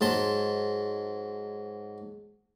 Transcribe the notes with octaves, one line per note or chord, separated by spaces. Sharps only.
G#2 F#3 A5 C6